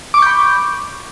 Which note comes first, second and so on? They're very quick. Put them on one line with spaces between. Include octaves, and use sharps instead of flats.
D6 C#6 G6 B5